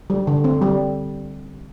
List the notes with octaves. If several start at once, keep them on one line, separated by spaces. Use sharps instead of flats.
G3
D3
C4
G3